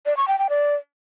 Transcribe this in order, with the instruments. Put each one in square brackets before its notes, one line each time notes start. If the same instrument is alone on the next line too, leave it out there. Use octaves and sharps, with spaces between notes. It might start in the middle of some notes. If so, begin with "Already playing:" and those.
[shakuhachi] D5
C#6
G5
G5
D5